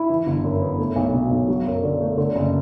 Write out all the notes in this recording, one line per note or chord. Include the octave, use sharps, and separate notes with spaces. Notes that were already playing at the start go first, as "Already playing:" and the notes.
Already playing: E4
E3
G1
F#2
B3
A3
B1
B2
B1
F#3
F#2
D3
A3
D3
F#1